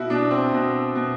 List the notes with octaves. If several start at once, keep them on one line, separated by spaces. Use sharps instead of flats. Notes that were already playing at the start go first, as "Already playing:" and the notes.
Already playing: B2 E4 F#4
B2 D4
C4
B2
B2